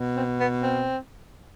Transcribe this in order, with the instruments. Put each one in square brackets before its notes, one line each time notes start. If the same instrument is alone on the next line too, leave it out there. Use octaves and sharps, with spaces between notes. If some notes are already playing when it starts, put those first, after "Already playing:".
Already playing: [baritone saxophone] B2
[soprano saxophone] C4
B3
C4